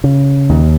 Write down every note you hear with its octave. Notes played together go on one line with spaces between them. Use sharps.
C#3
D#2